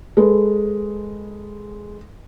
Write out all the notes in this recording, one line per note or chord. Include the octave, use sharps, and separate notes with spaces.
G#3 A4 B4